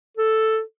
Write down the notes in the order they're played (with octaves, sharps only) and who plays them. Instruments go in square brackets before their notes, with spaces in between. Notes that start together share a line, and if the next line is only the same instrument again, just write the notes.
[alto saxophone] A4